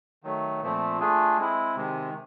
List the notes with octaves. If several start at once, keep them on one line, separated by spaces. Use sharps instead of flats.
D#3 F#3 A3
A#2 F3 A3 C4
A3 D4 F4 G#4
G#3 C4 E4
C3 D#3 G#3